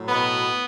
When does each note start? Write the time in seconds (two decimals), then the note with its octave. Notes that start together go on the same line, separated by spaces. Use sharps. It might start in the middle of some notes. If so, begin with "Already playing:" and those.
Already playing: A2 F#3
0.08 B2 B3